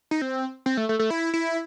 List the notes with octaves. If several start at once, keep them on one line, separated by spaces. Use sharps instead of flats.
D#4
C4
C4
A3
A3
A3
E4
E4